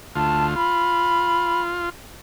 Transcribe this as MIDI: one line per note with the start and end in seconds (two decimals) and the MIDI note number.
0.16 0.55 38
0.16 0.55 65
0.16 0.46 81
0.56 1.89 65
0.56 1.61 83